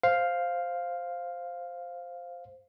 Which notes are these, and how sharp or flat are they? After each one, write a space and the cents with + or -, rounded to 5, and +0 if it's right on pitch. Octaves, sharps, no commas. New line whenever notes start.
C5 +0 F5 +0